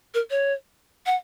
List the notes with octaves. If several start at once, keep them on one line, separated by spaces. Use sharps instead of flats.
A#4
C#5
F#5